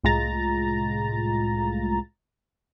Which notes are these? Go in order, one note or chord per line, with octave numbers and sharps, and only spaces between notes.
C2 A2 G#3 F4 A#5 A6